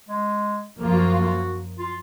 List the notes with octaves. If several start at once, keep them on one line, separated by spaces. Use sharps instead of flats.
G#3
F#2 F3 A#3 F4
F#4
F4